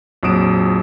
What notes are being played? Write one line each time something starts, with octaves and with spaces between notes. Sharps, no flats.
A#1 F2 F#3 D#6 D7 E7